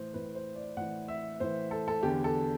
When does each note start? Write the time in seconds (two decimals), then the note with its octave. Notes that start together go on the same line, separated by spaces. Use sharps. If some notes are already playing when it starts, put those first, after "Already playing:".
Already playing: A2 E3 C5
0.13 A2 E3 B4
0.35 C5
0.56 D5
0.77 A2 E3 F#5
1.08 E5
1.40 A2 E3 C5
1.71 A4
1.88 A4
2.03 E2 D3 G4
2.24 A4